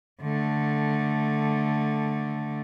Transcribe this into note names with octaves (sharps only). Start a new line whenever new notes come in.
D3 A3